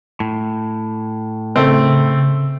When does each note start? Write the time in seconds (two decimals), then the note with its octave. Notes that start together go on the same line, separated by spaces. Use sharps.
0.20 A2
1.56 C#3 A3 C4